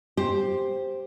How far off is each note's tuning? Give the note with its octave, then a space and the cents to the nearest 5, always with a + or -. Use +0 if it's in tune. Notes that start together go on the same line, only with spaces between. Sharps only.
G4 +0 C5 +5